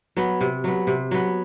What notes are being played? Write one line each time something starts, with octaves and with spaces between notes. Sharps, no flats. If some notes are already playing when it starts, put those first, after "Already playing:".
F#3 B3
C3
F#3 B3
C3
F#3 B3